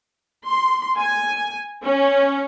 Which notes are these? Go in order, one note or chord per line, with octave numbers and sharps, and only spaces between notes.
C6
G#5
C#4